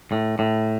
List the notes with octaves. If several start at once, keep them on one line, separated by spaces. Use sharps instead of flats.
A2
A2